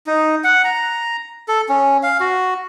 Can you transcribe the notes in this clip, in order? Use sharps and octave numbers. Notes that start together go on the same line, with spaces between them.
D#4
F#5
A#5
A4
C#4
F5
F#4